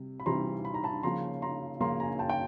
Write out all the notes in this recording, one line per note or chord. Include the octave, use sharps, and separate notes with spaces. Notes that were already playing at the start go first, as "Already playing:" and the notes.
Already playing: C3 G3
B5
C3 E3 G3 C4 A#5 C6
B5
A#5
A5 B5
C#3 F3 A#3 C#4 A#5 C6
A#5 C6
C#3 F3 A#3 C#4 A#5 C6
G#5 A#5
G5 A5
G5